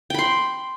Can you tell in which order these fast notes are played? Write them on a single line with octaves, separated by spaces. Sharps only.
G5 B5 C6